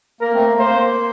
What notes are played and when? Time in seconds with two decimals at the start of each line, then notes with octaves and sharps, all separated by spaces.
0.21 A#3 A#4
0.33 A3 C4
0.46 A#3
0.53 A3
0.59 A#3 C5